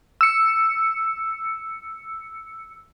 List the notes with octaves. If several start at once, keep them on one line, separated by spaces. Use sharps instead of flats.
E6 C#7